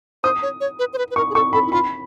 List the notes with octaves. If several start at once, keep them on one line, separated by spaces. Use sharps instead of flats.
C5 D#6
C#5
C#5
B4
C5
B4
B4
A#4 C#6
G#4
A4 C#6
A4 B5
E4
F4 B5